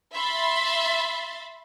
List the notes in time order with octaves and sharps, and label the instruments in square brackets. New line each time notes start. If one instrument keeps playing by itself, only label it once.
[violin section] E5 B5 C6 A6